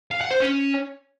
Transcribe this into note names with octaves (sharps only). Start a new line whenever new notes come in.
F5
F#5
C5
C#4